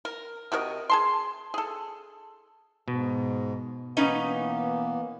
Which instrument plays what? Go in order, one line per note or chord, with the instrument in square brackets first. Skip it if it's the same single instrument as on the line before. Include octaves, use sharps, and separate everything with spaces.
[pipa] A#4
C3 F#4 A#4 D#5
G#4 A5 C6
G#4 A4
[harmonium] G#2 [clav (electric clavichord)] B2
[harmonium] E3 A#3 B3 [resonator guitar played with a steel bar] C#4 D#4 B4